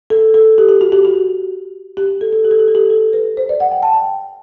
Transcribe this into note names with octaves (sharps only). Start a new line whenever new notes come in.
A4
A4
G4
G4
F#4
G4
F#4
G4
A4
A4
G4
A4
G4
A4
G4
A4
B4
C5
D5
F#5
G5
A5
G5